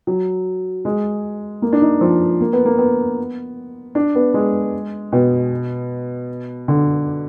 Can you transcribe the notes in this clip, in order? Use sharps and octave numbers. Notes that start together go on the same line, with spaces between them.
F#3
G#3
A#3
D4
D#4
F3
A#3
B3
A#3
B3
D4
B3
G#3
B2
D3